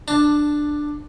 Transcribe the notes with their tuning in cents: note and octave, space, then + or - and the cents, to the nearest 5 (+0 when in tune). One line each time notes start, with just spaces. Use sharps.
D4 +10 A5 +0